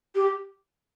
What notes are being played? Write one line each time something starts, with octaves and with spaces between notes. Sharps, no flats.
G4